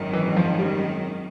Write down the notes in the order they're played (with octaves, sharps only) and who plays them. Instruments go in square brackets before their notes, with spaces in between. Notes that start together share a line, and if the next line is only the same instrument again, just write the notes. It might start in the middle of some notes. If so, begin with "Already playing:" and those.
Already playing: [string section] G#1 F#2 D#3
[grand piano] E3
F3
G3